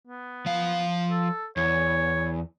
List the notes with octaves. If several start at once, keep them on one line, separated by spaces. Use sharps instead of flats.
B3
F3 F5
A4
E2 C#5